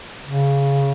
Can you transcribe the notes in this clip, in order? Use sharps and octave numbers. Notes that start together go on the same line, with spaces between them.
C#3